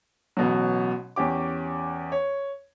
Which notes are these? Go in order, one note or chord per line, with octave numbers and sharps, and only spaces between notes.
A1 B2 F#3
E2 C#4 G4 D6
C#5